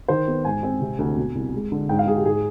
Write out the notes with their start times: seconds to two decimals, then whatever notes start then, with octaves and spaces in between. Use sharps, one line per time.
0.08 D#3 C5
0.28 B3
0.45 G#2 G#5
0.63 C4
0.81 C3
0.99 D2
1.17 B2
1.35 C2
1.54 G#3
1.72 D3
1.89 G#2 G5
1.99 F5
2.07 G#2 G#4
2.17 G4
2.25 G#2 G#4